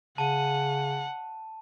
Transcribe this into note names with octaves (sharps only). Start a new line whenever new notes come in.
C#3 F#5 A5 D#7